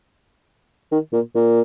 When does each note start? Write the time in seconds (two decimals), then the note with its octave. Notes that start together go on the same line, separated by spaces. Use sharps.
0.92 D#3
1.13 A#2
1.35 A#2